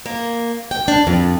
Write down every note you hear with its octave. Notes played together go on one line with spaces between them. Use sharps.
A#3
G5
D4
F2